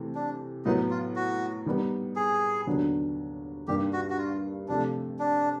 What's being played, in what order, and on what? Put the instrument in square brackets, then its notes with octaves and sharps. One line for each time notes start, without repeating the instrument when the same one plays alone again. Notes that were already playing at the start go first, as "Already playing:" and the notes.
Already playing: [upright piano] C3 E3 A3
[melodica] D4
[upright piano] A2 F#3 B3 [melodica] D#4
[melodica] F4
F#4
[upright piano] D#3 G3 B3 D#4
[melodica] G#4
[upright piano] D#2 D3 F#3 B3 D4
[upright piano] G2 D#3 G3 A#3 [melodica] G4
[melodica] F#4
F#4
F4
[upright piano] C3 F3 A3 [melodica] D4
[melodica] D4